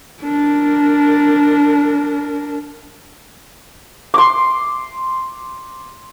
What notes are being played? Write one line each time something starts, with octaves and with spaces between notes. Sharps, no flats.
D4 A#4
C6 D6